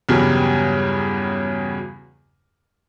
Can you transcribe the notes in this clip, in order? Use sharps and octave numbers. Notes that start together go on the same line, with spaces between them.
E2 G2 C#3 F#3 G3